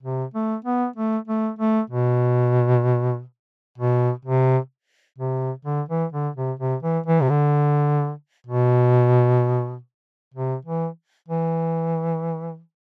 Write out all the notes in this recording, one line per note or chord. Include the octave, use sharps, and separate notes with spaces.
C3
A3
B3
A3
A3
A3
B2
B2
C3
C3
D3
E3
D3
C3
C3
E3
E3
C3
D3
B2
C3
E3
E3